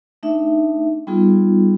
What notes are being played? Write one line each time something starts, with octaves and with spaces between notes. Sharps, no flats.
A3 D4 D#4 E5
G3 B3 D#4 F4 G#4